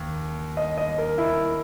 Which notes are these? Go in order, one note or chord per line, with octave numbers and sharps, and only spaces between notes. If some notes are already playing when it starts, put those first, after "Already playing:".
Already playing: D#2
D#5
D#5
A#4
E4